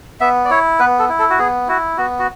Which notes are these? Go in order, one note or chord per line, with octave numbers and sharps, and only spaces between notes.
B3 E5
D5
E4 C#5
B3 B4
A4
E4
A4
F#4
B3 G#4
E4 F#4
B3 F#4
F#4